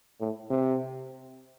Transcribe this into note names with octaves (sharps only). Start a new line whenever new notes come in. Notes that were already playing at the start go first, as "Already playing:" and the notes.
A2
C3